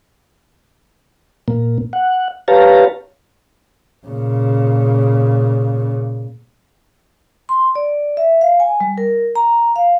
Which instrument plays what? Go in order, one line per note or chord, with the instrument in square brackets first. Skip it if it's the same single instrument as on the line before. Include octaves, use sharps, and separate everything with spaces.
[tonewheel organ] A#2 A#3
F#5
G4 B4 C#5 F5 A5 A#5
[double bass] A#2 C#3
[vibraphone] C6
D5
E5
F5
G#5
G3
A#4
A#5
F5